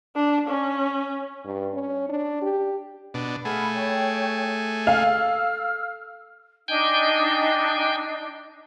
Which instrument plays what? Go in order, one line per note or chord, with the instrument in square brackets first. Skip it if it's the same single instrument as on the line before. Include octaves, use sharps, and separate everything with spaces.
[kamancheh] D4
C#4
[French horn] G2
C#4
D4
G4
[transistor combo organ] B2 D4
[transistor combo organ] A3 G#4 [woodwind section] F5 F#5 B5
[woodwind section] C#5 G5
[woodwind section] A4 E6 F6 [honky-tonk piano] F5
[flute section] D4 D#4 [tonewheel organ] G5 G#5 G6